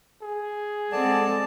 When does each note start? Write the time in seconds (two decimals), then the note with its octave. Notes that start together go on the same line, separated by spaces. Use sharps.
0.22 G#4
0.92 G#3 C4 A4 D5 F#5 A5